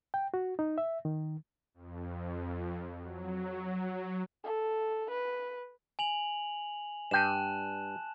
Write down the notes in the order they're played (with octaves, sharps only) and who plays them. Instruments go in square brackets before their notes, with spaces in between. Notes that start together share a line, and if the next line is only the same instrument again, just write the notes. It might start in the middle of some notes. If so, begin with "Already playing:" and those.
[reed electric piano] G5
F#4
D#4
E5
D#3
[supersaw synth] F2
F#3
[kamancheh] A4
B4
[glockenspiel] G#5 F7 F#7
[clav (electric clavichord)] G2 G5 [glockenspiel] A5 F#6 E7